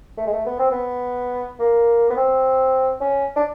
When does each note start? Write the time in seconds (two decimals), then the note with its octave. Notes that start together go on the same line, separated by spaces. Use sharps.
0.17 A3
0.27 G#3
0.33 A3
0.46 B3
0.59 C4
0.71 B3
1.59 A#3
2.10 B3
2.17 C4
3.01 C#4
3.36 D4